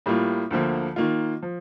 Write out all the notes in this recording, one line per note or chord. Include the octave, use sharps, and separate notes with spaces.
A2 G3 A#3 F4
D2 D3 F3 A#3
D#3 A#3 F4
F3